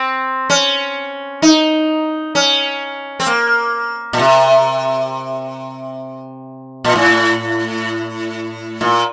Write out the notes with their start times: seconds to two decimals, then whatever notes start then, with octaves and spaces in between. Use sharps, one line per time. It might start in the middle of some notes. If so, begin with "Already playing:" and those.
Already playing: C4
0.50 C#4
1.42 D#4
2.35 C#4
3.20 C4
3.26 A#3
4.13 A#2
4.19 C3
6.84 A#2
6.96 A2
8.81 A#2